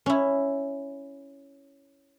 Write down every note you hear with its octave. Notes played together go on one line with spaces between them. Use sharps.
C#4 E4